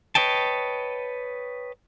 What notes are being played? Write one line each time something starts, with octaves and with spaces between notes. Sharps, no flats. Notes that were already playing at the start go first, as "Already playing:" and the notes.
B4 C#5 D#5 G5 A5